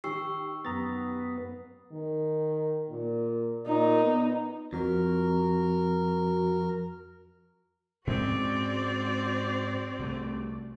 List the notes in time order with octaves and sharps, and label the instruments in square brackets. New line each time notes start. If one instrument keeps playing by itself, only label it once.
[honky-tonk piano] D#3 G4 [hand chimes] C#6 E6 C7
[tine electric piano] F#2 A#5 A6 [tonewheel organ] B3
[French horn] D#3
A#2
[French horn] A#2 [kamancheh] D#4
[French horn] B3
[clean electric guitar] F2 [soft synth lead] F#4 [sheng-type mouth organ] A#4
[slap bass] G#2 G#3 C#4 [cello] C4 [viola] F#4 D5
[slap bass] C2 A3